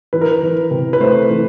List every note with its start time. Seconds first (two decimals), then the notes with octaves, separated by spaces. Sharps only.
0.13 E3 B4
0.21 A#4
0.31 B4
0.43 E3
0.71 C3
0.93 B4
1.00 A3 C5
1.30 E3